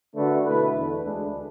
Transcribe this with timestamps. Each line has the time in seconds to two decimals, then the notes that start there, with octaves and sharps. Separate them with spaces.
0.15 D3 A3 D4 F#4 B4
0.44 B2 A3 E4 B4
0.74 E2 D3 A3
1.04 D2 D3 G#3 D4